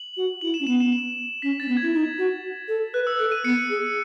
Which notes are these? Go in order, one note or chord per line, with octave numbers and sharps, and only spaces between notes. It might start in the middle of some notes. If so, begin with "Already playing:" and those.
Already playing: F#7
F#4
E4 F#7
E7
C#4
B3 E7
E7
E7
C#4 B6
C#4 A6
B3
G#6
E4
D#4
F#4
A4
B4 F#6
E6
A4 F#6
D#7
B3 C#7
G#4